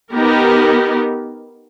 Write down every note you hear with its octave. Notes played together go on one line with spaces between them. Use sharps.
B3 D#4 G4 A#4